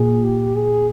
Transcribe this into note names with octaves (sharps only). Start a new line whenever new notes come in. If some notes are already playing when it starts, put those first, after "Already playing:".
Already playing: A#2 G#4
G4
G#4